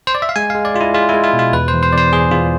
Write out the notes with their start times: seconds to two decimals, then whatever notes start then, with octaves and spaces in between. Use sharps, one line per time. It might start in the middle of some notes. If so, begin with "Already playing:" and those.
0.07 C5
0.15 D5
0.22 E5
0.29 F5
0.36 G#3 G#5
0.50 G#3 F5
0.65 D5
0.75 G#3 F4
0.81 E4
0.94 G#3 F4
1.09 E4
1.14 G#3
1.24 F4
1.33 B2
1.39 F4
1.53 E2 B4
1.68 C5
1.73 E2
1.83 C5
1.93 E2 C5 D5
2.13 E2 G#4
2.31 E2 F4